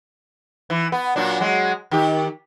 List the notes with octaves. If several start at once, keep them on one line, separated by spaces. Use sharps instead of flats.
E3
B3
A#2 F#3 D4
F#3 G#3
D#3 G4